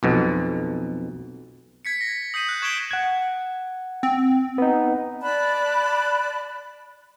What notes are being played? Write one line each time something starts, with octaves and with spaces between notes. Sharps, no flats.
B1 F2 B2
G#6 B6 C#7
A#6
D#6 G6 B6 C7 D#7
F#6
C#6 G#6 B6 D7 E7 G7
F#5 G#6
C4
B3 D#4
D5 A5 B5 F#6